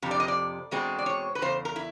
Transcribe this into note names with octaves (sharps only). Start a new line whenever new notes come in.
F2 C3
D5
D#5
D5
E2 B2 G#3 C4
D5
C#5
B4
E2 C#3 C5
A#4
E4